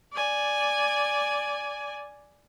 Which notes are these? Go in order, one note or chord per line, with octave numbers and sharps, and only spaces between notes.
D5 G#5